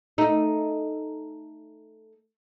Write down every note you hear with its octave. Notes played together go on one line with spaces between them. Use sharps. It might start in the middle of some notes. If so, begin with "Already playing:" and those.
A3 D#4